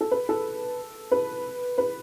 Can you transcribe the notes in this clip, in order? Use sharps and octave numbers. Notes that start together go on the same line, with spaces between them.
A4
B4
A4
B4
B4